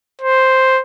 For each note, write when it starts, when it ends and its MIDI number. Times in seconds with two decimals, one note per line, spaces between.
0.22 0.82 72